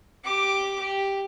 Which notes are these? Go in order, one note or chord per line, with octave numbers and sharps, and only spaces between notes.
G4 D6
G4